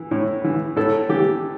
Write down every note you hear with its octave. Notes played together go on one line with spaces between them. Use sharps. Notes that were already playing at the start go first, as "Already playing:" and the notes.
Already playing: E3
A2
E3
A2 A4
E3 G4